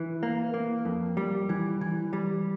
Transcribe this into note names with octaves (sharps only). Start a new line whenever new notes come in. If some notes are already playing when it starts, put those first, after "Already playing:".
Already playing: E3
A#3
A#3
F2
G3
E3
E3
G3